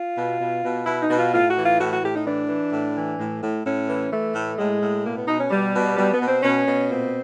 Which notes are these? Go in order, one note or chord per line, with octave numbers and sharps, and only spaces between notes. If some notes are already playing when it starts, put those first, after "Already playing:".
Already playing: F4
B2
B2
B2
B2 E4
D#4
B2
F4
A2 F4
F#4
E3
F4
A2 F#4
F#4
A2 G4
D#4
E3 D4
E3
A2
E3
A2
A2
A2 C#4
E3
E3 A3
A2
A2 G#3
A2
B2 A#3
B3
B2 D#4
C#4
B2 G3
B2
B2 G3
B3
B2
C4
B2 C#4
B2
A#2 C4